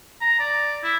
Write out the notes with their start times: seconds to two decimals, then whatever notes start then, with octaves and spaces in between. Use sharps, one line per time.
0.21 A#5
0.39 D5
0.84 E4